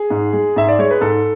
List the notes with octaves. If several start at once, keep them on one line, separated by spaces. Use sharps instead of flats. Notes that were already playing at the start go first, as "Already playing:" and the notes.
Already playing: G#4
G#2
G#3
G#2 E5
D5
G#3 C#5
B4
G#2 A4